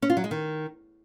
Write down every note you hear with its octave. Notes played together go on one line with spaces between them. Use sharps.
C#4
F4
F#3
G#3
D#3